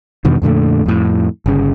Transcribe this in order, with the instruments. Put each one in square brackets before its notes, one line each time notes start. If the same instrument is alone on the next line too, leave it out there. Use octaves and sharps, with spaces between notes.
[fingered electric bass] E2 G2 B2 D#3
F2 A#2 D3 A3
F2 A2
G1 C#3